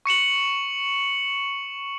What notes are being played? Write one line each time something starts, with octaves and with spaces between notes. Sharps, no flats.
C#6 C#7 E7 F#7